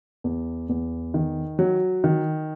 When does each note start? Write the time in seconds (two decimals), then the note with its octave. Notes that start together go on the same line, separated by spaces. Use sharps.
0.24 E2
0.69 E2
1.14 D#3
1.59 F#3
2.04 D#3